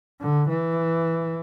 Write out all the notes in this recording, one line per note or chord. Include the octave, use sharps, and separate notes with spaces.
D3
E3